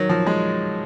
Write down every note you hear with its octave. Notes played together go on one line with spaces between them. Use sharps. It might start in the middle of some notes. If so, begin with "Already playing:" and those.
Already playing: D#3 F#3
F3
G#3